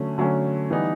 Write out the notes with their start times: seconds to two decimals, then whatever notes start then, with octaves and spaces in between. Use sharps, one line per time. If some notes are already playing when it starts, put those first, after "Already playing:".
Already playing: D3 F#3 A3 C#4
0.18 D3 F#3 A3 C#4
0.71 E3 G3 B3 D#4